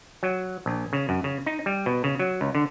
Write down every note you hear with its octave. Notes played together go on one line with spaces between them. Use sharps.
F#3
A#1
C#3
F#2
C#3
D#4
G3
B2
C#3
F#3
C#2
D3